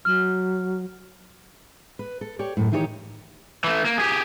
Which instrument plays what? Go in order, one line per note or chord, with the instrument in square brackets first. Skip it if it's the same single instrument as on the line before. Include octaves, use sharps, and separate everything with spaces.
[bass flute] F#3 [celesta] F6
[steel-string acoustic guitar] B4
A4
G4 C#5 D5
F#2 A2
D#3 E3 D#4 E4 G4 C#5
[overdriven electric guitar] E3 A3
A#3
G4 G#4